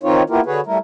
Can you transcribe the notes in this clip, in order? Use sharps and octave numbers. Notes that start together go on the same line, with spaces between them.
D#3 C4 D#4 F4 C#5
A#3 B3 E4 F4 G4 A#4
D3 F#4 G#4 B4 C#5
G3 A3 E4 A#4